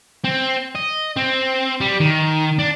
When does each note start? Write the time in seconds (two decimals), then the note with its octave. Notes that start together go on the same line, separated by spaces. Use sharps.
0.25 C4
0.76 D#5
1.16 C4
1.81 G3
2.00 D#3
2.59 D4